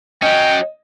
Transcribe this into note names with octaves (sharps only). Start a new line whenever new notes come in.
F#3 C#4 D#5 G5